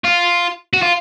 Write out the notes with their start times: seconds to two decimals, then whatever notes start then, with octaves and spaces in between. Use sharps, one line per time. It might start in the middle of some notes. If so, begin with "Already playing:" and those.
0.04 F4
0.73 F#4
0.83 F4